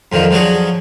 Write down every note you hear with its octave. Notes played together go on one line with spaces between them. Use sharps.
F2 D3 D#3 F3
D3 F3 F#3 F#4 G#4